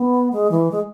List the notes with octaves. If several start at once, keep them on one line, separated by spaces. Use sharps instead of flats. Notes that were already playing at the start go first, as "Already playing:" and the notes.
Already playing: B3
G#3
E3
G#3